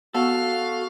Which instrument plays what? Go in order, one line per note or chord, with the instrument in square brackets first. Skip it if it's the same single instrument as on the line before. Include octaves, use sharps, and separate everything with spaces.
[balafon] B3 F#5 [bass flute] F#4 [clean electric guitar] A4 [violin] F5